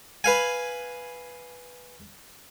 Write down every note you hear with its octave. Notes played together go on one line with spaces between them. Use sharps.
B4 F5 G#5